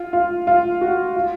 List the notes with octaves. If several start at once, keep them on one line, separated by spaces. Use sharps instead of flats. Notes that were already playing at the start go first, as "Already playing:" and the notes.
Already playing: F4
F4
F4
F#4
F4